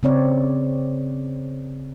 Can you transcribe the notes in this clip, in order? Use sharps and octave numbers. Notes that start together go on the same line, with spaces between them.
C#3 C4 C#5 D5